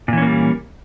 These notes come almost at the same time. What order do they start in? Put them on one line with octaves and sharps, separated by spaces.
A#2 E3 C#4 A#3 G3